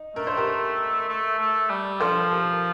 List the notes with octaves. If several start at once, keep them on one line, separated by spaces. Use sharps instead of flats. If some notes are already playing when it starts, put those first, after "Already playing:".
Already playing: D#4
A3 A#4
C5
G4 A#4
A3
A3
G3
F3 A4 C5
G4 A#4